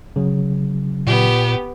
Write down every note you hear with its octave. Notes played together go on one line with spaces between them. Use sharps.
C#3 F#3
A#2 B3 G4